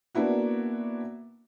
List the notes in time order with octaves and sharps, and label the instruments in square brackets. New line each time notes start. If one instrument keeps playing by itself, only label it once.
[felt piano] A#3 B3 D4 E4 F#4